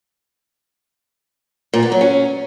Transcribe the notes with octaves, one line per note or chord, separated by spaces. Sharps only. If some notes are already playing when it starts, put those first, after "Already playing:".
A#2
B3
F#3
C#4